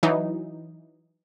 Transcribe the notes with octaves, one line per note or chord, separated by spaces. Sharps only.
E3 F#3 D#4